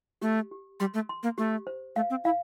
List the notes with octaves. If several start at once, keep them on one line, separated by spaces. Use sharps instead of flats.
A3 G4
G4
G3 C6
A3
C6
A#3
A3 G4
C5
A3 F5
C4
E4 F5